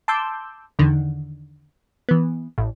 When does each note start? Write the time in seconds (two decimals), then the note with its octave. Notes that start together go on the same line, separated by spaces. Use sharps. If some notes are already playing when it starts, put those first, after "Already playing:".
0.08 A5 C6 D6 E6 G6
0.79 E2 D3 D#3
2.09 E3 B3
2.58 A1